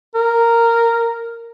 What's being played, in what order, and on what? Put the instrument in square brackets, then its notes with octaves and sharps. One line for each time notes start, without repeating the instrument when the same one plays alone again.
[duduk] A#4